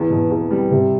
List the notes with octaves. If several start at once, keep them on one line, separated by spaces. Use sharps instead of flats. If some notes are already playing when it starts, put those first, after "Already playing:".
Already playing: E2
B2
E2
G3
C3